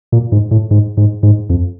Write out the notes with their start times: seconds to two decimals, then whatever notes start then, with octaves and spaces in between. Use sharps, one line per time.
0.12 A#2
0.32 G#2
0.51 A2
0.71 G#2
0.97 G#2
1.23 G#2
1.50 F2